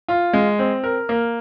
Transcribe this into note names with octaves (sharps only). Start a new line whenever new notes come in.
F4
G#3
C4
A#4
A#3